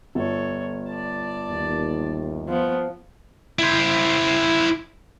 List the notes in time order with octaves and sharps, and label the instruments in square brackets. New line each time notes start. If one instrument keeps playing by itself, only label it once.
[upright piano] G1 [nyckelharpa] A4 C#5
[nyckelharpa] D5 A5
[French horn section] D#2
[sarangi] F3 [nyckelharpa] B3
[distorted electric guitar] E4 C5